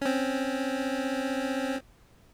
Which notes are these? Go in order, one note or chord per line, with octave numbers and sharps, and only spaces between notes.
C4 C#4